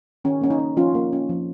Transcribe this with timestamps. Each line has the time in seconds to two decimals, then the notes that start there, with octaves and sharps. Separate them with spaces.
0.24 D#3 C#4
0.41 A#3 C#4
0.50 D#4
0.59 C#4
0.77 F3 C#4 F4
0.95 A#3
1.13 C#4
1.29 F3